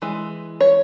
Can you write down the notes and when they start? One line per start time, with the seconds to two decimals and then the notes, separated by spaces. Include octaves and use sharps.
0.02 E3 G#3
0.61 C#5